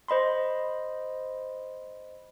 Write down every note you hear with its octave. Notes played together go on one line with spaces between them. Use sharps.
C5 D#5 B5 C6